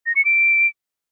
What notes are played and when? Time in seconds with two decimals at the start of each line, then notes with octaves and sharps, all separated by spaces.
0.06 A#6
0.16 C#7
0.25 D7